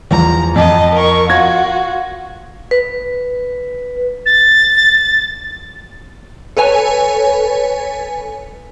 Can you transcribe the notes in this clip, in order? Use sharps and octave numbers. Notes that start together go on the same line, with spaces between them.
E2 F3 A#5
F2 D#5 A5
A#4 C#6
F4 F#4 C#6 G#6 A#6
B4
A6
A4 B4 C#5 G#5